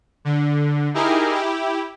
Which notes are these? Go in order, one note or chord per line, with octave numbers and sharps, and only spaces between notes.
D3
D#4 E4 G4 G#4 A#4
E4 G4